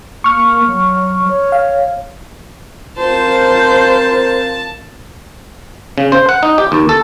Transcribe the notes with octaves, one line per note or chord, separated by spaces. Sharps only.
A#3 C#6 F6
F#3
C#5
F5
C4 F4 A#4 C5 A5
C#3
C5
F#5
D#4
G4
D#2
A4